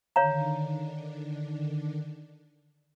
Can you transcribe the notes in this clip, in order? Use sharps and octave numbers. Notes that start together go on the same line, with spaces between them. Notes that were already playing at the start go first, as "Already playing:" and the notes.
D3 D#3 D4 C#5 F5 A#5